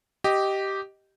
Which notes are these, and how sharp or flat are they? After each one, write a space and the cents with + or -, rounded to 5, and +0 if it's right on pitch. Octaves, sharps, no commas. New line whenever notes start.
G4 -10 D#5 +0